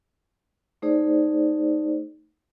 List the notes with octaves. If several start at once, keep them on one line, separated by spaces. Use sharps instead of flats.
A3 D#4 G#4 C5 D5